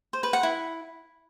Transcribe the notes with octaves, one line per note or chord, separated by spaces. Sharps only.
C5
B4
F#5
E4